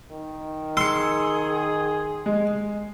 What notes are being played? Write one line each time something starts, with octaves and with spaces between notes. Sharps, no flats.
D#3
G#4 C6 E6 C#7
G#3